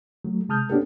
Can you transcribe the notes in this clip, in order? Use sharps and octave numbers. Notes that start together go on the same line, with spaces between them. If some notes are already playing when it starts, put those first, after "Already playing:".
F#3 A3
C3 G#3 A5 D#6 F6 G6
B3 C#4 D4 F#4 G4 A4